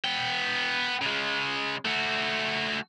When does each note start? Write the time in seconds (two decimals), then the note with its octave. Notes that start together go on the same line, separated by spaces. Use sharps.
0.05 B3 G5
1.02 C#3 G#3
1.85 A3 F#4